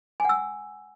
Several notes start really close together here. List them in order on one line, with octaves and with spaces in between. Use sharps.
G#5 F#5 E6